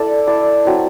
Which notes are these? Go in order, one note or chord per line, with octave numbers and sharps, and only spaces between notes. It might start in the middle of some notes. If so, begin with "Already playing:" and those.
Already playing: E4 A4 D5
E4 A4 D5
F#3 C4 E4